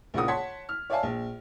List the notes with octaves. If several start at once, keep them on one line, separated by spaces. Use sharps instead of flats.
A#1 C#3 A#3 F4 F#5 D#6
C#5 F#5 A5 C6 G#6 B6
F6
C#5 D5 E5 F5 G#5 A5
A#1